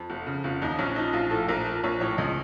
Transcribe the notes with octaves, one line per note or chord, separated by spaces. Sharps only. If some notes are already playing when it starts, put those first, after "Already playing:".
Already playing: F2
F1
C#3
F1 F4
D#2 D#4
A#1 C#4
F3 D#4
A#1 F4
A2 A4
A#1 A#4
F3
A#1 C#5
A2 C#5
C#2 D#5